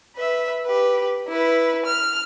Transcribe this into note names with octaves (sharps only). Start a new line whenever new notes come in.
B4 E5
G4 B4
E4 B4
F6